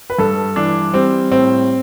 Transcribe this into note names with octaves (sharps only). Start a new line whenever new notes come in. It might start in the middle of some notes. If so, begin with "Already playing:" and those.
B4
G2 A4
E3 D4
G3 C4
A2 C4